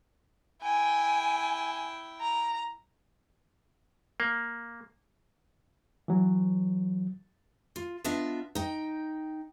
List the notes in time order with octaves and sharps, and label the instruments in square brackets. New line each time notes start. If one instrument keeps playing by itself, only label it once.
[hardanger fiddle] E4 G5 [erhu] G#5
[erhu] A#5
[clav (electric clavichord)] A#3
[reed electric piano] E3 F#3
[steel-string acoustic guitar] F4
B3 D4 F4 D#5 E5
D#4 G5